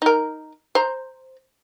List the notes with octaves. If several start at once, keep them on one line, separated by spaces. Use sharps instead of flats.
D#4 A#4
C5 A#5